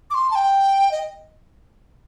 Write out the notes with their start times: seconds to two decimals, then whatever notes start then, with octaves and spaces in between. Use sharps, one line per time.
0.10 D6
0.14 C6
0.31 A5
0.35 G5
0.91 D#5